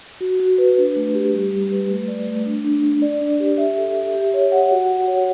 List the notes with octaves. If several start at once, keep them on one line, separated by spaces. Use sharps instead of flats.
F#4
F#4
B4
D4
A3
G4
G3
G3
B4
A3
D5
A3
D4
D4
D4
D5
D4
G4
E5
A4
E5
G4
C#5
F#5
F#4
F#4
C#5